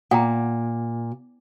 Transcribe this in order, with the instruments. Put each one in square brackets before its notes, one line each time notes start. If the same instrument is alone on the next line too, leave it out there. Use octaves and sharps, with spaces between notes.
[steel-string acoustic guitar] A#2 [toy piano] F#5 G5 A#5